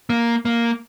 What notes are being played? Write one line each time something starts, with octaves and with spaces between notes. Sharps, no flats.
A#3
A#3